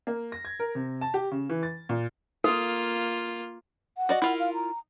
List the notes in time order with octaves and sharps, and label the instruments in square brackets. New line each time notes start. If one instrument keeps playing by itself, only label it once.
[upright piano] A#3
A#6
G#6
A#4
C3
A5
G4
C#3
E3
A6
A#2
[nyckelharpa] A#3 F4 [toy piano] A4
[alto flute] F#5
[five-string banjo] F#4 D5 D#5
E4 F4 A#4
[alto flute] F5
A#5